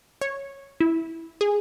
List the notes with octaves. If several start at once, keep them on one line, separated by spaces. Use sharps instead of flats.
C#5
E4
G#4